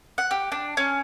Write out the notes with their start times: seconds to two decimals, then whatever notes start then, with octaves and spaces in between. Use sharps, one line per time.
0.18 F#5
0.31 G4
0.52 D4
0.77 C#4